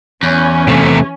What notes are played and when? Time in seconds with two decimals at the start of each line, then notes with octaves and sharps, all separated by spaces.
0.23 E2 E3 C#4
0.69 C3 A3